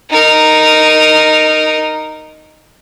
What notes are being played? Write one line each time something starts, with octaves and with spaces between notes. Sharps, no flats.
D#4 A#4